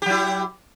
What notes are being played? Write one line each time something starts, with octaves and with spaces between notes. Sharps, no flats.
F#3 E4 G4